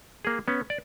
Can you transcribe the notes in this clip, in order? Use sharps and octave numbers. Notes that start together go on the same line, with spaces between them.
A#3 G#4
B3 C#4
D5